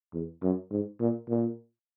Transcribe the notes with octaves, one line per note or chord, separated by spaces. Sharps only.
E2
F#2
G#2
A#2
A#2